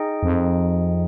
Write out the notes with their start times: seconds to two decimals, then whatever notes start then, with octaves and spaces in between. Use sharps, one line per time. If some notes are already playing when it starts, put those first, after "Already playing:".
Already playing: D#4 G#4 D#5 G5
0.23 F2